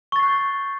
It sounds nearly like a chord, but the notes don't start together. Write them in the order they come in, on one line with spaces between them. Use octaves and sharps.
C#6 A6 C7 F#6 G6